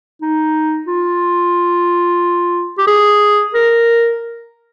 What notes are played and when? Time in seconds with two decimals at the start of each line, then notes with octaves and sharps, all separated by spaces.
0.21 D#4
0.87 F4
2.78 G4
2.87 G#4
3.54 A#4